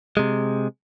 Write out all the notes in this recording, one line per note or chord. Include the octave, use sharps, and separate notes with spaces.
C3 G#3